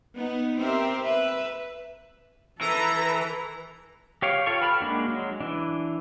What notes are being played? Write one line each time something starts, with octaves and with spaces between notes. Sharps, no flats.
B3 D#4
C4 G4 A#4 C5 E5
B4 E5
E3 A4 B4 A#5
G4 C#5 F5 G5
F4 A4 C#5 F5 C#6
B4 G5 A5 B5 F6
G#3 A#3 D4 F#4
F#3 G#3
E3 D4